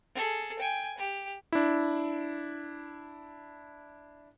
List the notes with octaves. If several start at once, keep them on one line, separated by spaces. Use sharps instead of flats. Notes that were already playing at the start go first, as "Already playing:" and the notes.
G#4 A4
G5 G#5
G4
D4 E4